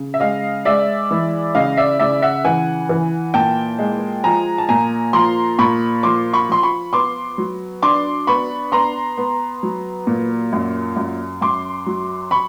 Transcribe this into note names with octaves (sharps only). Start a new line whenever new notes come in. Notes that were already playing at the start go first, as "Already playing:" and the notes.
Already playing: C#3
E5
G#3 D#5 F5
G#3 D5 E5
E3
C#3 D#5 F5
D5 E5
C#3 D5 E5
E5 F#5
E3 F#5 G#5
E3
A#2 G5 A5
G#3
F3 G#5 A#5
A5
A#2 G#5 A#5
F3 A#5 C6
A#2 B5 C#6
F3 C6 D6
B5 C#6
F3 C6
B5 C#6
B3 C6 D6
F#3
D4 C6 D6
B3 B5 C#6
B3 A#5 C6
B3
F#3
A#2
F#2
F#2
F#2 C6 D6
F#3
B5 C#6